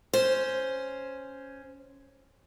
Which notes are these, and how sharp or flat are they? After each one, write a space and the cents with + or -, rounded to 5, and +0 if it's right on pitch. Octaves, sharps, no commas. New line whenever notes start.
C#4 +0 C5 +0